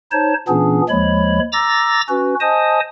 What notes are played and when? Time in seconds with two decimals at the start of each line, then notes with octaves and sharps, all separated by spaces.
0.12 D#4 C5 C#5 A5
0.48 A#2 E3 B3 C#4 D4 G#4
0.89 D#2 F3 G#3 C#5 B5
1.53 A#5 D6 E6 A6 A#6
2.09 C#4 F#4 B4
2.41 C5 D#5 G#5 A5 D#6